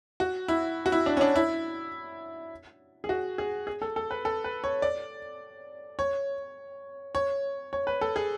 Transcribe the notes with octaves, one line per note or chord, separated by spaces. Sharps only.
F#4
E4
F#4
E4
D4
C#4
D4
E4
G#4
F#4
G#4
G#4
A4
A4
B4
A4
B4
C#5
D5
C#5
C#5
C#5
B4
A4
G#4